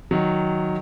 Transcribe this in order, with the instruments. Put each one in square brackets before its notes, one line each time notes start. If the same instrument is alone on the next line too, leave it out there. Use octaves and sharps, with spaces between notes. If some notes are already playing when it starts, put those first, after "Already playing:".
[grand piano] D#3 F#3